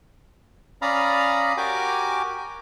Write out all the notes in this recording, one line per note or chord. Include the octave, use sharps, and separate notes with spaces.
C#4 D5 F5 A#5 B5 D#6
F#4 G4 A#4 G5 G#5 D6